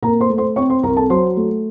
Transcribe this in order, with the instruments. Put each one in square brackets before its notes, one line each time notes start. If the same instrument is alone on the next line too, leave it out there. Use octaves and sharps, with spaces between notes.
[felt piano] A#2 A#4 A#5
C5 C6
A3
C5 C6
C4 C#5 C#6
C5 C6
C2 A#4 A#5
A4 A5
F#3 C5 C6
A3